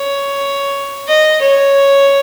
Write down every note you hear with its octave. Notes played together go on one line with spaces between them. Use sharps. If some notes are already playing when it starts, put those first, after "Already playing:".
Already playing: C#5
D#5
C#5